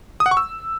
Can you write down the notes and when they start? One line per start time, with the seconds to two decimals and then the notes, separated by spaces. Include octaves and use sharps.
0.20 D#6
0.26 F#5
0.31 C#6
0.37 E6